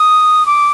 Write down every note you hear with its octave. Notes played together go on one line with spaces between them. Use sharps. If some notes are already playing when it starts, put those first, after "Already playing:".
Already playing: D#6
D6